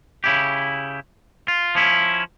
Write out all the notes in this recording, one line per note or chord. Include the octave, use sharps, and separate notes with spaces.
C#3 E4 G4
F4
F3 C#4 E4